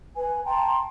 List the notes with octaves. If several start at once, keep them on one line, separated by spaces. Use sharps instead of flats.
B4 G#5
G5 A5 A#5 C6